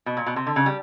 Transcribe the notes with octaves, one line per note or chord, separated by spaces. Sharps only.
B2
A#2
B2
C3
D3
C#3
G3